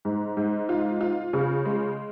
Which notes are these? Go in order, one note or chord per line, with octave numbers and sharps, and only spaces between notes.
G#2
G#2
F4
F4
C#3
G#3